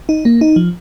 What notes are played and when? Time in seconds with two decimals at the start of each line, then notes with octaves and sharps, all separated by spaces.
0.09 D#4
0.25 A#3
0.41 D#4
0.56 F3